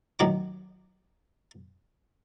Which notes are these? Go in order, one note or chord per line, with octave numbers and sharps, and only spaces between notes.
A1 D#3 F#3 D6